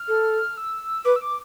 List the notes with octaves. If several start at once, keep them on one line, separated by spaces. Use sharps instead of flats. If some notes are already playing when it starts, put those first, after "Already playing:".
Already playing: F6
A4
E6
B4 D6
E6
D6